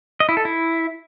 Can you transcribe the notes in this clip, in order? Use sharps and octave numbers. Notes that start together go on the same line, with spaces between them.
D#5
E4
A4
E4